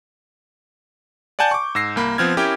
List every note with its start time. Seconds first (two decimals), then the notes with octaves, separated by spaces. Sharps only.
1.39 D5 F#5 G#5 A5 G6
1.51 C#6 D6
1.75 G#2 E6 A#6 C7
1.96 C2 A#3 B5
2.18 F3 B3 C4 F6 G#6
2.37 C#4 E4 G4 A#4 G5